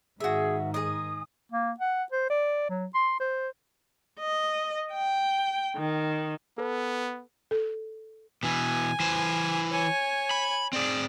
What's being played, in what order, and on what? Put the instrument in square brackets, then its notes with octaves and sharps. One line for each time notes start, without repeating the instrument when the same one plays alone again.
[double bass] G#2 D#3 [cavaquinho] F#4 E5 [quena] G#4
[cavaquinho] G#4 D#5 [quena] D#6
[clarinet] A#3
F#5
C5
D5
F#3
C6
C5
[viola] D#5
G5
D#3
[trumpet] B3 [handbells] A4 B4
[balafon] A4
[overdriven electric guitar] B2 E3 [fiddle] G#5
[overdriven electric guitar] E3 C5
[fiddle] C#5 G#5
[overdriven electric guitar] B5
[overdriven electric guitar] C4 G#4 [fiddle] D5